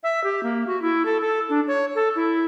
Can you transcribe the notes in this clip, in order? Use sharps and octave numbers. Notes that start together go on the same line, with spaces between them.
E5
G4
A#3
F#4
E4
A4
A4
D4
C#5
A4
E4